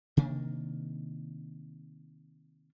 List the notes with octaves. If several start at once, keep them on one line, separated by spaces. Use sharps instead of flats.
C3 D#3 A#3 D4